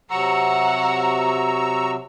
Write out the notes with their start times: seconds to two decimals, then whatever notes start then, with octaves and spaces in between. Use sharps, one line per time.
0.10 C3 F#3 F#5 A#5 C#6 E6